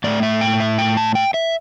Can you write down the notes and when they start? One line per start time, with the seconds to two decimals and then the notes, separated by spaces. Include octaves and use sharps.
0.04 A2 A3 D5
0.23 E5
0.41 G5
0.60 E5
0.78 G5
0.97 A5
1.15 G5
1.34 E5